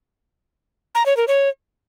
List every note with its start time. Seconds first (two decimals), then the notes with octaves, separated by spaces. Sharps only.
0.95 A#5
1.06 C#5
1.17 A#4
1.28 C#5